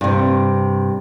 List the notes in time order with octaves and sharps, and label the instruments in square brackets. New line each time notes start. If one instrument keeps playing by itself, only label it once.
[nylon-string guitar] G2 C3